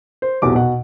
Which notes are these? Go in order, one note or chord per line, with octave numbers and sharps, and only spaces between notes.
C5
B1 E2 C3 D6
B2 F#5